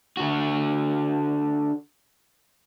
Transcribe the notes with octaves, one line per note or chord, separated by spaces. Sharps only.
D3 F#4